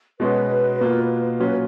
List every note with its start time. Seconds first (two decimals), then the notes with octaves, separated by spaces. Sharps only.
0.20 B2 G#3 C#4 F#4 B4
0.81 B2 A#3 F4
1.40 A#2 F#3 C#4 F4 B4